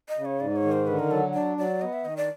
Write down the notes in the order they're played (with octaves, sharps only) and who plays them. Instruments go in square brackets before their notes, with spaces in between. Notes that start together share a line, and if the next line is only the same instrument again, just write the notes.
[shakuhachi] D#5
[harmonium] C#3
[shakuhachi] C#5
[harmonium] G#2 [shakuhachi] D5
[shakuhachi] C#5
[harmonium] D#3
[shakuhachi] C5
[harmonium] D3 [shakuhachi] B4
[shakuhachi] A#4
[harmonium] F#3 [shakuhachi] A4
[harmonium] D4 [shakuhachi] D5
[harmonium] F#3 [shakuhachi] D5
[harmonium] B3 [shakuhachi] D#5
[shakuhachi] E5
[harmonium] D#3 [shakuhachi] D#5
[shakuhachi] D5